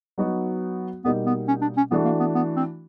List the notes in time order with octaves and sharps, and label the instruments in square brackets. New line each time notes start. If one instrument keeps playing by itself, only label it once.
[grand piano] F#3 B3 D#4 F#4
[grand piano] B2 G3 A#3 D#4 [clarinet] B3
[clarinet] B3
C#4
D4
C#4
[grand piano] E3 A3 D4 F#4 [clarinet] B3
[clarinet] A#3
B3
B3
C4